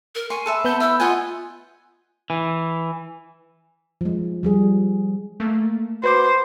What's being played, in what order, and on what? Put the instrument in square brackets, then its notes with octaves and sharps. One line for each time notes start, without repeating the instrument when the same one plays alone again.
[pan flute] A#4
[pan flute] G#5 [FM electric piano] C6 [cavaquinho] C#6
[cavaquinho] A4 B4 E5
[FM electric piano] B3 B5 G6 [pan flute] A5
[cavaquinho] E4 [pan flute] E6
[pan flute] F4 [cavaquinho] D#5 F#5 G#5
[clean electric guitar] E3
[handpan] F3 G#3
F3 G3 G#4
[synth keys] A3 A#3
[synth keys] F#4 D6 [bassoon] B4 [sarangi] C5